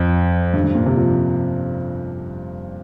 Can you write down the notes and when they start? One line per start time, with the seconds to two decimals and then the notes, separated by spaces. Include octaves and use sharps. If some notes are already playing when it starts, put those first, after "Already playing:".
Already playing: F2
0.54 G2
0.64 G2
0.75 A#2
0.86 C3
0.97 F3